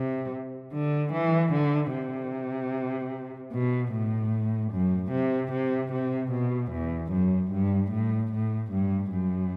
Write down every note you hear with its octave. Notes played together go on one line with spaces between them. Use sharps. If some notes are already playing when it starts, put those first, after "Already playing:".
Already playing: C3
D3
E3
D3
C3
B2
A2
F#2
C3
C3
C3
B2
E2
F#2
G2
A2
A2
G2
F#2